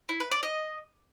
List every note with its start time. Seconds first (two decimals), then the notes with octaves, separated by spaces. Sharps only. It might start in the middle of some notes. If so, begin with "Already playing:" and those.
0.09 E4
0.20 B4
0.31 D5
0.43 D#5